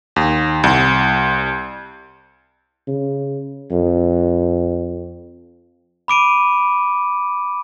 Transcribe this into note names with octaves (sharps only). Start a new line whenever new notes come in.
D#2
C2
C#3
F2
B5 D6 D7 D#7